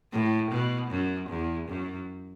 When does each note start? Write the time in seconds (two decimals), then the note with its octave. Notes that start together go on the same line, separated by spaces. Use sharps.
0.13 A2
0.51 B2
0.91 F#2
1.30 E2
1.69 F#2